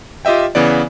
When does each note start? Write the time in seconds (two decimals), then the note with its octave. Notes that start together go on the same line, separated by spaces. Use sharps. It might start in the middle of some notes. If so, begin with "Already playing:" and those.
0.25 F4 G4 D#5 E5 G5
0.55 C#3 E3 B3 D5